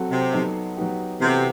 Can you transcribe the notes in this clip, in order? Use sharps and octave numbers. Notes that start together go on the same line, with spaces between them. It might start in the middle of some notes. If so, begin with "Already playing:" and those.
Already playing: F#3 C4 F#4 A4
C3
F#3 B3 D#4 A4
F#3 B3 D#4 G4
C3 E3 B3 F#4 A4